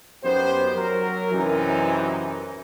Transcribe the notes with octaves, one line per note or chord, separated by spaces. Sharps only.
F#2 B3 D#4 G4 C5
F#3 A#4
F#2 C3 E3 D#4